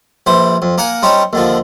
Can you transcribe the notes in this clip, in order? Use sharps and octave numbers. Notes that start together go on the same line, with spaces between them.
A#1 E3 C5
F2
A#3 A#4 F#5 G#5
G3 C4 C#4 D#4 C#5
D#2 D3 F3